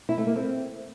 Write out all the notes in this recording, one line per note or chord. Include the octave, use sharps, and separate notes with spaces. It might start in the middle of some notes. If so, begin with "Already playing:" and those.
E4
A3
A#3
C4